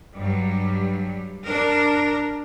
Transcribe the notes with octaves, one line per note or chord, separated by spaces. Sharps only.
G2 F#3 G3
D4 A#4